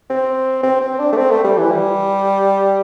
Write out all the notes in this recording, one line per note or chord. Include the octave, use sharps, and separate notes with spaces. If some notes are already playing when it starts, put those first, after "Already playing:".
C4
C4
C4
D4
A3
C4
A3
G3
E3
G3